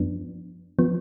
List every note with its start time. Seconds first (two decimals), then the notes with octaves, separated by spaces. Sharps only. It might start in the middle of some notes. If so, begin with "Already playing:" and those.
Already playing: F#2 F3 B3 D4
0.79 F3 B3